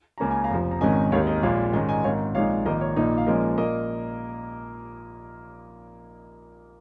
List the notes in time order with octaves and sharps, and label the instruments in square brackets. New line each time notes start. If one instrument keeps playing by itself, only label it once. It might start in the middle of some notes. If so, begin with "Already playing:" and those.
[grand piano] C#2 C#3 A#3 C#4 A#5
G#5
F5 A#5
F1 F2 F3
A#5
G#1 G#2 D#3 C#4 D#5 G#5
D#2 D#3 G#3 D#4 C#5 F5
A#4 D#5
A#1 A#2 G#3 C#5 F5
G#2 D#3 G#3 C#4 D#5 G#5
D#5 G#5
G#1 G#2 D#3 C#5 F5
A#1 G#2 G#3 D#4 C#5 F5
A#1 G#2 D#3 A#3 A#4 D#5
C#5
A#1 A#2 A#3 D#4
F5
A#1 A#2 F3 G#3 C#4 A#4 D#5
A#2 A#3 A#4 D#5